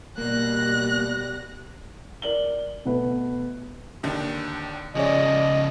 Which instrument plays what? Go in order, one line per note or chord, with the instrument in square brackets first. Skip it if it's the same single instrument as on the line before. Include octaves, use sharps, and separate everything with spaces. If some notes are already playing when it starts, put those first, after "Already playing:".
[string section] B2 G3 A#6 [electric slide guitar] A#3 [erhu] F#6
[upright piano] A#4 D5 F#7 G7
B2 A3 B3 B4
[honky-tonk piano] D#2 D3 D#3
[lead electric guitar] C#3 F3 [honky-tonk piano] G#4 D5 [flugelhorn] D#5